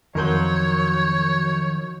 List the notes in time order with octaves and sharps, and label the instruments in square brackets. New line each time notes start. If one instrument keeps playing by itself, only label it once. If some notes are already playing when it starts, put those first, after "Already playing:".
[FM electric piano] F2 A#4 G6 [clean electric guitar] D#3 F3 F#3 [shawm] C#5